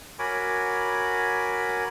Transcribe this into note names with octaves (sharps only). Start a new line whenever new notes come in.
F#4 A#4 C#5 G#5 B5 D6